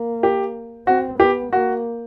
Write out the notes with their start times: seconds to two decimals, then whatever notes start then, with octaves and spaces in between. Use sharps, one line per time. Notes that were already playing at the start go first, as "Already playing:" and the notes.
Already playing: A#3
0.23 G4
0.87 C4 F#4
1.19 B3 G4
1.52 A#3 F#4